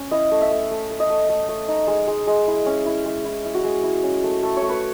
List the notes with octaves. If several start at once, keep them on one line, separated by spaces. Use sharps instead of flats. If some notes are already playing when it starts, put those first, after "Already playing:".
Already playing: C#4
E4 D#5
A3
E5
A3
A3
A3
D#5
A3
A3
A3
D#4
G#3
G#3
G#3
E4
C#4
E4
G#3
E4
E4
F#4
G#3 G#4
E4
C#4
A3
A3
C#5
A3
B4